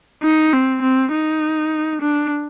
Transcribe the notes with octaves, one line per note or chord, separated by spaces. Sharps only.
D#4
C4
C4
D#4
D4